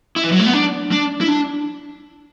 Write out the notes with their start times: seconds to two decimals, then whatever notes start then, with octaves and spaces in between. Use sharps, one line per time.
0.16 E4
0.24 E3
0.32 F#3
0.40 A3
0.46 B3
0.53 D4
0.92 D4
1.21 E4
1.28 D4